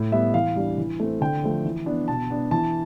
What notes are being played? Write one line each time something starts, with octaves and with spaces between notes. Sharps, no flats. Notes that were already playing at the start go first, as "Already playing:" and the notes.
Already playing: A2
G3 B3 E5
E3 F5
G3 D4
E3
A3 C4
D3 G5
F3 A3
E3
B3 D4
B2 A5
B3 D4
E3 A5